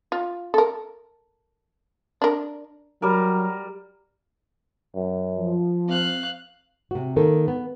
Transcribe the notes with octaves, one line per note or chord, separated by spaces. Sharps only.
F4
A4 A#4
D4 A#4
F#3 G3 A#4
F#2
F3
C4 F5 F#6
C3 F#4
D#3 A#3 A4
B3